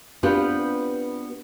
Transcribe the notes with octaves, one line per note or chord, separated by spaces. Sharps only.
B3 C4 D4 F4 G4 B4